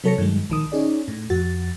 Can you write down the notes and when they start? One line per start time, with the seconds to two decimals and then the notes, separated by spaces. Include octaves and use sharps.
0.04 C3 F#3 A4 C#5 A#6 C#7
0.18 G2 D#3 F#3 G#3
0.50 A#1 D#3 D#6
0.72 C#4 D#4 G#4 D5
1.08 A2
1.30 F2 F#4 A6